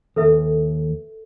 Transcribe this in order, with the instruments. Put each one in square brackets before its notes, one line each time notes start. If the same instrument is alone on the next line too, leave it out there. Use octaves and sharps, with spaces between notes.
[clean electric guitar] D#2 [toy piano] A4 B4 E5